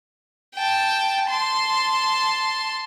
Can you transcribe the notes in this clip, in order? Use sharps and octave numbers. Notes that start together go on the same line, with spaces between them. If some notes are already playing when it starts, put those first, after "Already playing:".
G5 A5
A5 C6